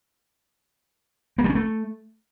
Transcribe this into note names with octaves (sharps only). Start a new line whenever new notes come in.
A#3
G3
C#4
A3